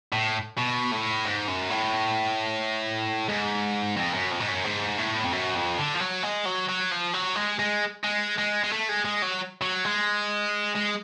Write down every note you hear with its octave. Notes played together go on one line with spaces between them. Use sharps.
A2
B2
A2
G#2
F#2
A2
G#2
F2
F#2
F2
G#2
F#2
G#2
A2
F2
F#2
F2
D3
F3
F#3
G#3
F#3
F#3
F3
F#3
G#3
G#3
G#3
G#3
G#3
A3
G#3
G#3
F#3
F#3
G#3
G#3